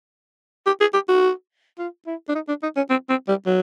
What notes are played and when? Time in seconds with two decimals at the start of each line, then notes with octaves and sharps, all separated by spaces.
0.66 G4
0.81 G#4
0.94 G4
1.09 F#4
1.79 F4
2.07 E4
2.29 D4
2.35 D#4
2.48 D4
2.63 D#4
2.76 C#4
2.90 C4
3.09 C4
3.28 G3
3.46 F#3